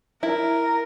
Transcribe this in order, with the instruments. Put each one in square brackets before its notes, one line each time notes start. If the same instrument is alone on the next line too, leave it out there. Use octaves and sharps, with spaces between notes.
[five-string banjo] E4 [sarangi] A#4